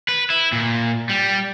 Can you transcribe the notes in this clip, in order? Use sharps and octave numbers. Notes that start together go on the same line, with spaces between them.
B4
E4
A#2
G3